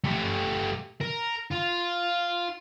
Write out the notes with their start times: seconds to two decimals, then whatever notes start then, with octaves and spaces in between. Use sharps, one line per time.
0.04 A3 G4
1.01 A#4
1.52 F4